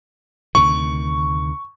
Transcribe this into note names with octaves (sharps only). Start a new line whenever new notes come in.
D2 C3 D#3 C#6